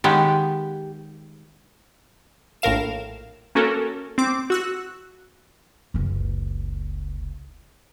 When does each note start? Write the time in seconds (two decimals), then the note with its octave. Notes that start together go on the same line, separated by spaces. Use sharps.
0.04 D#3 G#3 B3 G4
2.62 A#1 A2 A#4 F5 E7
3.55 A#3 C#4 F#4 A4 A#4
4.18 C4 D6
4.50 F#4 E6 F#6
5.94 F#1 C#2